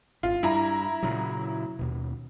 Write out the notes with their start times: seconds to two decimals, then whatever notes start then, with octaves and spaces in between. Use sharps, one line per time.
0.23 G#1 F4
0.43 G2 E4 A#5
1.03 A#2 C#3 F#3
1.79 D#2 B2